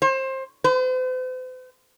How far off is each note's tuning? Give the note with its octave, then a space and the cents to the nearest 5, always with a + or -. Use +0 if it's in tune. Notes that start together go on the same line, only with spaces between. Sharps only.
C5 +25
C5 -45